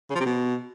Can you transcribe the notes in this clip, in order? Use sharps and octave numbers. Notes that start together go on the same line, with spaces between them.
C#3
F3
C3
B2